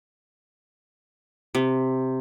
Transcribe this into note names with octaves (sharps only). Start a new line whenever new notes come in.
C3